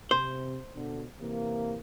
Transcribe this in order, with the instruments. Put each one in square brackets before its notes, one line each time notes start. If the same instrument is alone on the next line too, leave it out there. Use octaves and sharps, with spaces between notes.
[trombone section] C3 [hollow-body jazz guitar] C5
[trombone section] B2 D3
C3 E3 A#3